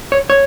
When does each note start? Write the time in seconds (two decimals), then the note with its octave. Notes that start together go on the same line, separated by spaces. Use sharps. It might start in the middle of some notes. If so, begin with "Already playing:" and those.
0.12 C#5
0.30 C#5